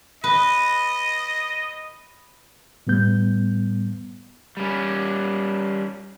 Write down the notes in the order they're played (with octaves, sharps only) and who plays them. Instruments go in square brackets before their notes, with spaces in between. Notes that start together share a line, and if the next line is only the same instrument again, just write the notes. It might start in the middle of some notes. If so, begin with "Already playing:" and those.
[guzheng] B4 [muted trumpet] D#5
[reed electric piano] A2 G3 B3 G6
[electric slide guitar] G3 C#4